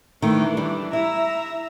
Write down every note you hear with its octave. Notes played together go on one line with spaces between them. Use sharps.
D#3 E3 A3 D4
G3
E4 E5 A#5